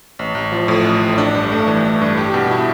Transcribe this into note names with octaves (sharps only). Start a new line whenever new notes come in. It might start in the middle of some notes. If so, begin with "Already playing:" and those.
A1
A1
F3
A2
A1
A1
D4
G2
A3
E3
D4
G2
G4
B2
E4